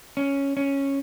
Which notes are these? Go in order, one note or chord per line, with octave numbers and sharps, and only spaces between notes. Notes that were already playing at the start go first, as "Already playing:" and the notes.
C#4
C#4